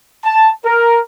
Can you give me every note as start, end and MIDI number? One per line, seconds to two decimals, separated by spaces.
0.24 0.49 81
0.64 0.99 70